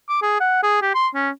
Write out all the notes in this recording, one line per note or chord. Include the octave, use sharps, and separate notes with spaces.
D6
G#4
F#5
G#4
G4
C6
C#4